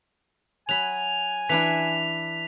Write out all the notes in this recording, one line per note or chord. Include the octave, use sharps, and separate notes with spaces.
F#3 G#5 B5 F7
E3 D4 E4 B6 F7